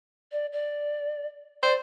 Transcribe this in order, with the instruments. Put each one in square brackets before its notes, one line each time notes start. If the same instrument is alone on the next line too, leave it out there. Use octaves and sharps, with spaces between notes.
[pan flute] D5
D5
[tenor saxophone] C5 [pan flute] D5